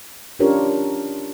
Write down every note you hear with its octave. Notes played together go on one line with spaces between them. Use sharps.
C#4 D4 F4 G4 A#4 C#5